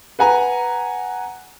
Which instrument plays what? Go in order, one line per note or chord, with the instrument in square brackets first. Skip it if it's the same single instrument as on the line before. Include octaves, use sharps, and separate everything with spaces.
[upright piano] B4 F#5 G#5 A#5